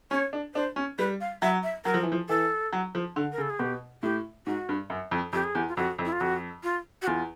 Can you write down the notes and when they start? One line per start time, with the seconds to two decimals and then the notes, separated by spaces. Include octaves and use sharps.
0.11 C#4 C#5
0.33 D4
0.54 D4 C5
0.76 C#4
0.99 G3 B4
1.21 F5
1.42 F#3 E5
1.63 E5
1.85 F#3 A#4
1.94 F3
2.03 E3
2.12 F3
2.29 E3 A4
2.73 F#3
2.95 F3
3.16 D3
3.32 A#4
3.38 C#3
3.42 A4
3.50 G#4
3.59 B2 G4
4.03 A2 G4
4.46 G#2 F#4
4.69 G2
4.90 F#2
5.11 F2
5.33 F2 G4
5.44 G#4
5.55 E2 G4
5.68 F4
5.77 F2 F#4
5.99 F2
6.05 E4
6.12 F4
6.20 F2 F#4
6.63 F4
7.02 F#4
7.07 E2 F4